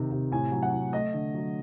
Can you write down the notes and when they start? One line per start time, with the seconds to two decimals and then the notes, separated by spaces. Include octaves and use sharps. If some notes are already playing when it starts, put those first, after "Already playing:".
Already playing: C3 D#3
0.11 C3
0.31 A2 G#5
0.52 F#3
0.63 F#5
0.73 A2
0.93 A3 D#5
1.14 D3
1.34 F#3